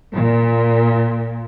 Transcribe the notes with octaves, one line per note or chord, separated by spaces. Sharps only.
A#2